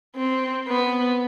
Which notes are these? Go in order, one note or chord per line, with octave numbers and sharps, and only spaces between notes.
C4
B3